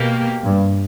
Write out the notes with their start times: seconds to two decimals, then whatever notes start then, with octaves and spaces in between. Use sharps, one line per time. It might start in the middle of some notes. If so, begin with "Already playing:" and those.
Already playing: B2 A#3 G4
0.44 G2